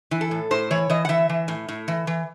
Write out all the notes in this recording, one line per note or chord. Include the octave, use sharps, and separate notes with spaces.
E3
A4
A2
A2 C5
E3 C#5
E3 D#5
F#5
E3 E5
E3
A2
A2
E3
E3